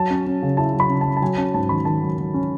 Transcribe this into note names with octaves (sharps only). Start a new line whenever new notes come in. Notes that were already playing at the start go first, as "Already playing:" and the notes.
Already playing: F#3 A5
C#4
C#4
C#3
E4 A5
F#3
B5
C#3
A5
F#3
A5
F#3 G#5
C#4 A5
G#2 A5
D#3 B5
D#3 A5
F#3
F#3
C#4